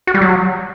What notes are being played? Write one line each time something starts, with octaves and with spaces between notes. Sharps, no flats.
F#4
G3
F#3